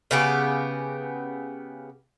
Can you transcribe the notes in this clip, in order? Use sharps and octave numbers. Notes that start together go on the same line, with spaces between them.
C#3 B3 G4